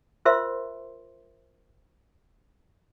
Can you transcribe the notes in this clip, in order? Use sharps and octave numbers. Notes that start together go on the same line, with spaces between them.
F4 A#4 C5 E5 C6